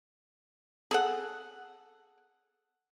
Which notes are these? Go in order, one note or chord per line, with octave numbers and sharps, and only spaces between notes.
G#4 A4 F#5